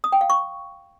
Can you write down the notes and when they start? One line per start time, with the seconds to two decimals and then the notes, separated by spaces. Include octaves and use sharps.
0.04 D#6
0.12 G5
0.21 F5
0.30 C#6